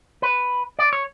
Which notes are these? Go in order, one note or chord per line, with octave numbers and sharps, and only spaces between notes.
B4
D5
C#5